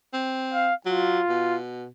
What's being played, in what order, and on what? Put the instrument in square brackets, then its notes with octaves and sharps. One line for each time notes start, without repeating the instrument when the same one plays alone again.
[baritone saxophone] C4
[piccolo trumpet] F5
[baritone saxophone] F#3 [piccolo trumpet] F4
[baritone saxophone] B2